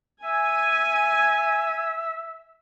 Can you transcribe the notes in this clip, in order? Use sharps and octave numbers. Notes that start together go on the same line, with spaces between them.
E5 G#5